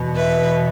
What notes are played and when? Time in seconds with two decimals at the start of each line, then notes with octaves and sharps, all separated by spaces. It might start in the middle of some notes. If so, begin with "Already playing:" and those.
Already playing: E2 B2 B3
0.17 B4 E5